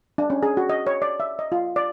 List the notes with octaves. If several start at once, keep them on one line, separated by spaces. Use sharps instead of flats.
D4
C#4
G#4
F#4
D#5
C#5
D5
E5
D#5
F4
D5